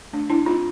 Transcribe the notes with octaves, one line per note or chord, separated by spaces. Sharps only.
A3 D4
D4 E4
C4 D#4 F4